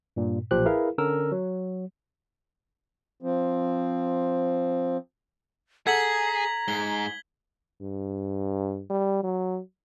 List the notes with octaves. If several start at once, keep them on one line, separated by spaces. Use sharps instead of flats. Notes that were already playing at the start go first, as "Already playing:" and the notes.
G2 A#2
B1 A#2 F3 G4 C5 F#6
E4 G#4 A#4 B4 F5
D3 C#4 A#4 E6
F#3
F3 C4
G#4 A4 F#5 A#5 G#6 B6 F#7
G#2 G7
G2
G3
F#3